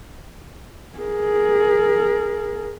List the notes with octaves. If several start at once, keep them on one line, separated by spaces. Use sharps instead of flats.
G#4 A#4